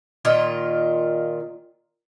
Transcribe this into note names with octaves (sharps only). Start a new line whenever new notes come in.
A#2 D#3 F4